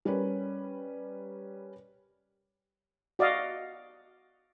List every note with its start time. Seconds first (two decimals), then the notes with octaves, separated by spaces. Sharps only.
0.05 G3 C#4 A#4 B4
3.19 F#4 D5 D#5 F5